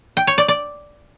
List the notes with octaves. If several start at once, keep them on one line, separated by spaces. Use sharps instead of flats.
G5
C#5
D5
D5